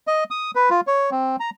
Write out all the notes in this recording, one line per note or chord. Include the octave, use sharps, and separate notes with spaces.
D#5
D#6
B4
F4
C#5
C4
A#5